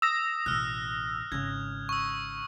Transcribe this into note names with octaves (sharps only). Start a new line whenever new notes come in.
D#6 E6 A#6
A1 B2 F6 F#6
G#1 C#3 G#6
C#6 E6